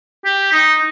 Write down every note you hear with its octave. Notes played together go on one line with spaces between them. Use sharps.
G4
D#4